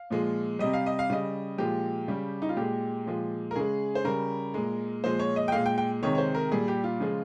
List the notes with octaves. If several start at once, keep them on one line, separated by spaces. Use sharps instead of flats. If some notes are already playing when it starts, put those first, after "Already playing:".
Already playing: F5
A#2 F3 G#3
C3 G3 D#5
F5
D#5
F5
C#3 G3 D#5
A#2 F3 G#3 G4
C#3 G3
D#4
F4
A#2 G#3 G4
A#2 F3 G#3
A#4
C#3 G#3 G#4
C5
C#3 G3 A#4
A#2 G#3
A#2 F3 G#3 C5
C#5
D#5
G5
A#2 G#3 F5
G5
G5
C3 D#3 G#3 C#5
C#5
C5
A#4
A#2 G3 G#4
G4
F4
C#3 F3 G#3